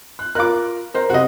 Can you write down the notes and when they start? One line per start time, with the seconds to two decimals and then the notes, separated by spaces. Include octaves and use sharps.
0.19 F#6
0.35 F4 A#4 D6 F#6
0.94 A#4 C5
1.10 C3 F#4 D#5